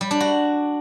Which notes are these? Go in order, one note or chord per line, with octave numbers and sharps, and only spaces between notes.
G3
D4
F#4